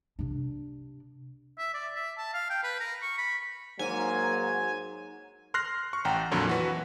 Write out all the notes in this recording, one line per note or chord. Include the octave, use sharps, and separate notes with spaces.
C3 D4
E5
D5
E5
A5
F5
G5
B4
A#4
C#6
B5
G#2 F#3 A#3 G#5
C6 F6 F#6 A#6 C7
C#6
A1 F#5 G5 A#5
F2 A#2 D3 F3 F#3
E3 F#4 B4